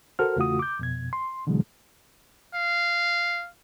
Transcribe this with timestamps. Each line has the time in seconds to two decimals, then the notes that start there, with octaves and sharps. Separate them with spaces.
0.19 F#4 A4 A#4 C5 F6
0.36 E2 C#3 A3 F4 F#4 D#6
0.59 D6 G6
0.79 F2 B2 G#6
1.13 C6
1.47 B2 D3 E3 F#3 G#3
2.54 F5